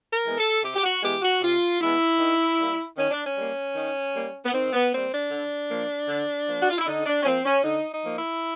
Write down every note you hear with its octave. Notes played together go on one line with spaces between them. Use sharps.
A#4
E3 G#3 B3
A4
C3 G4
G4
F#4
E3 G#3 B3 G4
F#4
C3 F4
E3 G#3 B3 E4
D#3
G3 A#3
D#3 C#4
D4
C#4
G3 A#3
D#3
G3 A#3
B3
D#3 C4
B3
G3 A#3 C4
D4
D3
F3 A#3
D3
F3 A#3
F#4
F4
E4
D3 D#4
D4
C#4
F3 A#3 C4
C#4
D3 D#4
D#4
F3 A#3
E4